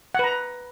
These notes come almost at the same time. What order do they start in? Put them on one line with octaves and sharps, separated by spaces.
F#5 B4 A#5